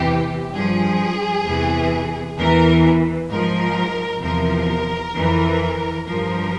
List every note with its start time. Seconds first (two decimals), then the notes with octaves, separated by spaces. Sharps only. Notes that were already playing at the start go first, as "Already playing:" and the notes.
Already playing: E2 C3 E3 G4
0.54 G2 F3 G#4
1.46 E2 C3 E3
2.38 E2 E3 A#4
3.30 G#2 F3 A#4
4.22 E2 C3 F3 A#4
5.14 F2 E3
6.06 G2 F3 A#4